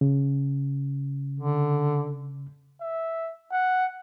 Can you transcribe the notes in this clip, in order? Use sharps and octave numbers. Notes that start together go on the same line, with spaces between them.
C#3
D3
E5
F#5